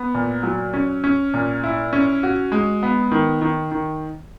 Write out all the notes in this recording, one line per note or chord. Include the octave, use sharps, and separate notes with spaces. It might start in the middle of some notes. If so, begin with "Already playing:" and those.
Already playing: B3
A#2
F#3
C#4
C#4
A#2
E4
C#4
F#4
G#3
B3
D#3
D#3
D#3